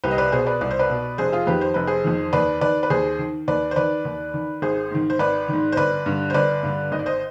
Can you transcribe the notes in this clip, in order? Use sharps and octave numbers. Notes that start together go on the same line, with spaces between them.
C2 G4 B4
D#5
B4 D5
B2 G#4 C5
B4 D5
C2 D5
C5
B4 D5
B2
F1 G#4 C5
F4 G#4
F2 D#3 G4 B4
C5
F1 B4
G#4 C5
F2 D#3
D#2 B4 D5
D#3 B4 D5
B4
D#2 G#4 C5
D#3
D#2 B4 D5
C5
D#3 B4 D5
D#2
D#3
G#1 G#4 C5
G#2 D#3
C5
G#1 B4 D5
G#2 D#3
C5
G1 B4 D5
G2 D3
C5
G1 B4 D5
G2 D3
G#1 D#5
D5
C5 D#5